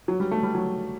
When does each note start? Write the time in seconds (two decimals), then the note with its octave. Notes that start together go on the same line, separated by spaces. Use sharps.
0.08 F#3
0.20 G3
0.31 A3
0.43 G3
0.55 F#3